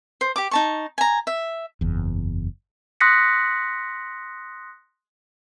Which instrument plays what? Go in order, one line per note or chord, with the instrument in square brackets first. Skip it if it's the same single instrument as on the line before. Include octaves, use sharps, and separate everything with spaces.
[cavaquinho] C5
G4 D6
D#4 A5 C#6
G#5 A#5
E5
[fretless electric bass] F#1 E2
[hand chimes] C6 D#6 F#6 A#6 B6 C#7